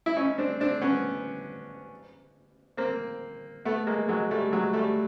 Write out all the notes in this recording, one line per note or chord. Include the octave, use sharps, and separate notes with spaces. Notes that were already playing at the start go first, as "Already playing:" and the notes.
E4
C#4 D#4
C4 D4
C4 D4
B3 C#4
A#3 C4
A3 B3
G#3 A#3
F#3 G#3
G3 A3
F#3 G#3
G3 A3